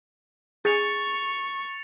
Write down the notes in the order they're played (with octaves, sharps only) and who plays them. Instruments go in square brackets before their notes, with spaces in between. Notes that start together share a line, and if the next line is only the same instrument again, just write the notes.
[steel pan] G#4 G#5 [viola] C#6 [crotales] A6 C#7 F7